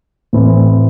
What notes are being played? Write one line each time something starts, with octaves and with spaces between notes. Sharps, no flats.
A2 E3 C4 E4